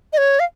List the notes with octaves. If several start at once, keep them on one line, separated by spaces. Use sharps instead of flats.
D#5
C#5
F5